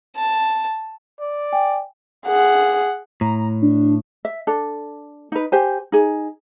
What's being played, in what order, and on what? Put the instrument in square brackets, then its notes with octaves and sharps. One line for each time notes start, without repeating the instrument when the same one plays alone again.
[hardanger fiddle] A5
[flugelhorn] D5
[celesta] G5 G#5
[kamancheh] G#4 F#5
[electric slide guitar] A2 [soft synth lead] A#5
[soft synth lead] D4
[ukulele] E5
D4 A4
D#4 B4
G4 C5 G#5
D#4 G#4